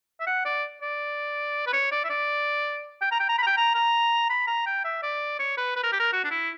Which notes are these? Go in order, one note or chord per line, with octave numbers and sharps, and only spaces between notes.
E5
F#5
D5
D5
B4
C#5
D5
E5
D5
G5
A#5
G5
A#5
B5
A#5
G5
A#5
A#5
B5
A#5
G5
E5
D5
C#5
B4
B4
A#4
G4
A#4
F#4
D4
E4